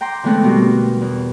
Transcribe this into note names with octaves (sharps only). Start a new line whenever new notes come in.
G5 A#5 C6 D6
D3 E3 G#3 A3 B3 C4
B2 D3 G3 A#4
E2